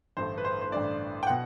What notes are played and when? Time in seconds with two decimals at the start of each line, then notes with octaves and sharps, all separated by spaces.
0.17 A1 G2 D3 A3 C5
0.38 B4
0.45 C5
0.61 C5
0.72 A1 G2 D3 A3 D5
1.23 G5
1.27 B2 F#5